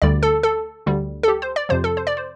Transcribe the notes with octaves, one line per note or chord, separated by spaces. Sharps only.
D2 D3 G3 D5
A4
A4
D2 D3 G3
A4
G4
C5
D5
F2 C3 F3 C5
A4
C5
D5
C5